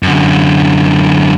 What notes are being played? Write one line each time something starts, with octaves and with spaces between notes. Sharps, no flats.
F#2 D3